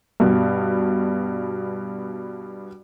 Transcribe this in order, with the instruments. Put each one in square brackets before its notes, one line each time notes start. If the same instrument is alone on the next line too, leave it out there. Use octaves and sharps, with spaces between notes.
[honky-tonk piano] G2 B2